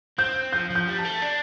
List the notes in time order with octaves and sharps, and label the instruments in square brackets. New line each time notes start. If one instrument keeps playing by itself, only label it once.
[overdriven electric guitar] C4 [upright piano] G6
[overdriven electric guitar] F3 [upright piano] G6
[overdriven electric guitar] F3
[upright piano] G6
[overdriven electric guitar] G3
[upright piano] A5
[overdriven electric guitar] A3
D4